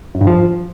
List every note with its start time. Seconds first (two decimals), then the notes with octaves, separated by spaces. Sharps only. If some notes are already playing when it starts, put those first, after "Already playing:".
0.15 F#2
0.21 G2
0.27 F3